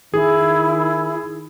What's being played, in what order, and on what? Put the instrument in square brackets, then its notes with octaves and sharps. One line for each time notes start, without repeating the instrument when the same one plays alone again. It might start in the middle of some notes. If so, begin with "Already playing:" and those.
[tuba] D#3 [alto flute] E4 [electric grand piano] G#4